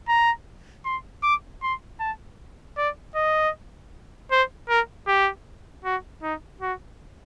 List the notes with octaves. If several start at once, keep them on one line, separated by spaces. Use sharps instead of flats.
A#5
C6
D6
C6
A5
D5
D#5
C5
A#4
G4
F#4
D#4
F#4